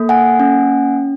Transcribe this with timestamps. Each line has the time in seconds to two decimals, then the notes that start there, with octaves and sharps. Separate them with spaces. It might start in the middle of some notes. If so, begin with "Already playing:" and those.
Already playing: A#3 A4
0.09 F#5 G#5
0.40 C#4